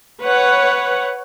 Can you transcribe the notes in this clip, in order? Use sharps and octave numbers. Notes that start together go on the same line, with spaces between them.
B4 C#5 F#5